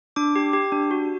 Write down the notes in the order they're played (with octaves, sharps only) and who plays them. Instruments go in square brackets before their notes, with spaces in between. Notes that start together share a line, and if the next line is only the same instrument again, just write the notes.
[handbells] D4 D6
G4
G4
D4
F#4